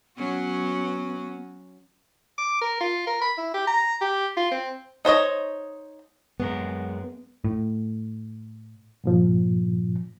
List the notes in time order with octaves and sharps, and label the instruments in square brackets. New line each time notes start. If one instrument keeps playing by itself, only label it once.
[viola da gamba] F#3 C#4 F#4 [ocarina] B3
[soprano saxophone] D6
A#4
F4
A#4
B5
E4
G4
A#5
G4
F4
C4
[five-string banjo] D#4 C5 C#5 D#5
[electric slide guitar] F#2 G#3 A#4 [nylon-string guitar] B3
[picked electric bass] A2
[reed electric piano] G2 A#2 F3